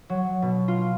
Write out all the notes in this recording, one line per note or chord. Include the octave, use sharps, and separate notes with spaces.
F#3
B2
F4